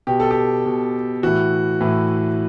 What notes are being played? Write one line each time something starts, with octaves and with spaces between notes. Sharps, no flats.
B2 G4
A4
G4
B2
A2 E3 F#4
A2 E3